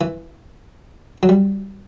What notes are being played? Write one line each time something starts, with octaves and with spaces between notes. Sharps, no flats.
E3
F#3
G3